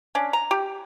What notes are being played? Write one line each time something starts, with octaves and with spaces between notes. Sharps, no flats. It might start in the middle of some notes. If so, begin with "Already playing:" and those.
C#4 D4
A#5
G4